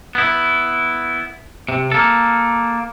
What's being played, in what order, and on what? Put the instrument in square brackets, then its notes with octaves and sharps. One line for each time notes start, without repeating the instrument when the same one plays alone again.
[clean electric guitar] B3 E4
C3
A#3 A4